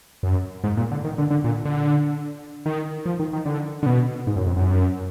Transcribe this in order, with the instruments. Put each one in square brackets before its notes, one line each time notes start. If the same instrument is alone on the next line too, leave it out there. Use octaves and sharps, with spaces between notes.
[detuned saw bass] F#2
G#2
A#2
D3
D#3
D3
D3
A#2
D3
D#3
F3
D#3
D#3
D3
D3
B2
G#2
F#2
F2
F#2